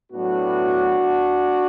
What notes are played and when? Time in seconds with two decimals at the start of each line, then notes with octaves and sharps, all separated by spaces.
0.13 A2 F#3 B3 D4 F#4